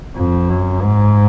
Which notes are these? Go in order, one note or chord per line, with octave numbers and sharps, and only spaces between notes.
F2
F#2
G#2